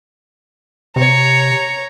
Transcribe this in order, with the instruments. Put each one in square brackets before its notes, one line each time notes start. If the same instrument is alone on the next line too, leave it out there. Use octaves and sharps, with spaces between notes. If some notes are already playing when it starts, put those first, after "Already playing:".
[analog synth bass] C3 [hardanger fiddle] C#5 A#5